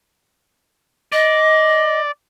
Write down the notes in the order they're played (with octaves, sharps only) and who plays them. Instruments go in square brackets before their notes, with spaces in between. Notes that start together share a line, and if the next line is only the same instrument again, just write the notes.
[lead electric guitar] D5 [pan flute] D#5